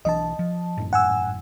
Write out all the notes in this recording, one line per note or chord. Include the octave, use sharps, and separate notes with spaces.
B1 E3 D4 D#5 A5
F3
G#1 F#2 A2
F#5 G#5 E6